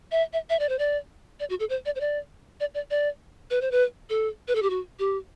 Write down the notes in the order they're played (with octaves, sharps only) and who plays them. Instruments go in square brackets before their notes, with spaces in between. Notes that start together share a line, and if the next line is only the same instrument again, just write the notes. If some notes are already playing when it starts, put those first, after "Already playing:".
[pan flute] E5
E5
E5
D5
C5
D5
D5
F#4
A4
C5
D5
C5
D5
D5
D5
D5
B4
C5
B4
A4
B4
A4
G4
F#4
G4